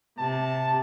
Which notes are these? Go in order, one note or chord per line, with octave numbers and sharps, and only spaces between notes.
C3 A5